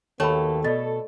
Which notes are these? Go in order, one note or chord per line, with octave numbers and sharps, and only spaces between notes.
D#2 B2 A3 A#3 A4 C#5 G5 B5
B2 A4 D5 D#5